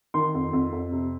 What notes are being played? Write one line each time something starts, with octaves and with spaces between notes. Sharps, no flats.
D#3 C6
F2
F2
F2
C3